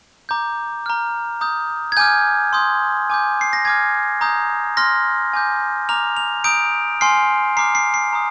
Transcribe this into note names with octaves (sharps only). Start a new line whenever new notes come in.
A#5 D6 G6
A#5 F6
A#5 D#6 G6
G#6
G#5 D6 F6 G6
C6 D#6 G6
G#5 D6 G6
C7
A#6
G#5 D6 F6 G#6
A#5 D#6 G6
C6 F6 A#6
G#5 D6 G6
A#5 D6 F6 F7
F7
A#5 D#6 G6 D7
G#5 C6 F6 C7
A#5 D6 F6 C7
C7
C7
A#5 D#6